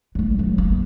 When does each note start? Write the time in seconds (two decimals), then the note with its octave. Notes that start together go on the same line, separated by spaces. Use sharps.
0.15 F#3 A3
0.39 E3 F#3
0.58 A#3